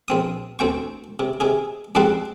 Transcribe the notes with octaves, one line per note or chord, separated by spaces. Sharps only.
A#1 C4 D#6
D2 C4 G5 C#6
C3
C3 D#4 G#4
F2 G#2 G3 C4 F#5 C6